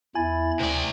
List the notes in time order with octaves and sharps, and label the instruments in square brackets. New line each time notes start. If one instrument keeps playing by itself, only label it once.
[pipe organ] E2 B5 A6 [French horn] E4 [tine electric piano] G#5
[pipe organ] D2 G5 [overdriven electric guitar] C3 D5